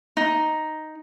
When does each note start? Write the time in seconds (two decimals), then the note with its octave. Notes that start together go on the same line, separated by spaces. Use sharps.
0.17 D#4